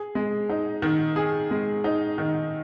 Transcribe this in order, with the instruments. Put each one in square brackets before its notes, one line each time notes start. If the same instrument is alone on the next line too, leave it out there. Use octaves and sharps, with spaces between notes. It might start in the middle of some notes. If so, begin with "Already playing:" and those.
Already playing: [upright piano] G#4
G#3
D#4
D#3
G#4
G#3
D#4
D#3